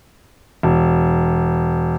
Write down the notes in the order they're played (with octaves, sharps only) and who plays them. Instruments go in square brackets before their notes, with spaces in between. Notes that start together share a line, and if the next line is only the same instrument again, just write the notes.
[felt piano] E1